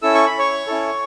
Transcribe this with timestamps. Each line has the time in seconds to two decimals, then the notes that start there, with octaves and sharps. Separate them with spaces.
0.02 C#4 E4 A4 E6
0.15 C#6
0.26 B5
0.39 C#5 C#6
0.67 C#4 E4 A4